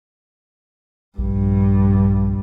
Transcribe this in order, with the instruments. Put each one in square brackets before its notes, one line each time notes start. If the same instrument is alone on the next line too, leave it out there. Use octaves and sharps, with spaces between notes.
[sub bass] A#1 [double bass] G2